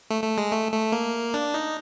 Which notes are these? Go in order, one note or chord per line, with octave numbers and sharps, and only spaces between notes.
A3
A3
G#3
A3
A3
A#3
D4
D#4